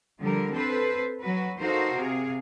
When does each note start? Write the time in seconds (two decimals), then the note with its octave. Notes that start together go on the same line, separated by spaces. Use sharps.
0.19 D3 F3 G3 A#4
0.52 C4 A4 B4 C5
1.21 F#3 F#4 B4
1.58 D#4 F#4 A4 A#4 C5 F5
1.93 C3 G#4 F5